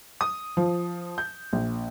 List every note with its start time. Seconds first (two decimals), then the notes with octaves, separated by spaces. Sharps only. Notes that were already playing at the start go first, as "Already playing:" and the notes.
0.21 D#6
0.57 F3
1.18 G6
1.53 A#1